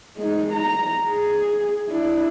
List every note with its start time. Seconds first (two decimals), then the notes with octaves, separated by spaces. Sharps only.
0.17 G#3 D#4
0.53 A#5
1.08 G#4
1.89 D4 E4